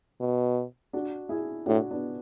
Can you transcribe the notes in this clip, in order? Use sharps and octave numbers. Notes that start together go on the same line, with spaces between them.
B2
D4 F#4
E4 G#4
A2 D4 F#4
B3 D4